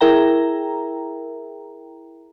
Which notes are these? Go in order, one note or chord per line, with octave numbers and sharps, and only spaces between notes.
E4 G#4 A#4 E5 G5 A#5